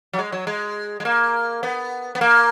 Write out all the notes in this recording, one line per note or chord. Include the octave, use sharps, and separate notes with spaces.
F#3
G#3
F#3
G#3
G#3
A#3
B3
B3
A#3